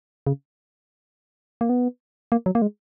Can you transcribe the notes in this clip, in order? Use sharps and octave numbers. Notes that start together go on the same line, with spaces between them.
C#3
A#3
B3
A#3
F#3
A#3
G#3